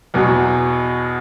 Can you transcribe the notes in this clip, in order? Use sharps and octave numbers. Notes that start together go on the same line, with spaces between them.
E2 B2 F#3